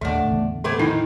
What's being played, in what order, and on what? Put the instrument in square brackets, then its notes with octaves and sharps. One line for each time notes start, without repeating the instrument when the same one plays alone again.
[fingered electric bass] D#1 D#2 [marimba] A2 D3 F#5 [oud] A3 D4
[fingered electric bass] E2 C#3
[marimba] A2 D6 G#6 [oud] A3 B3 C4
[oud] D#3 [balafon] D#4 E4 G5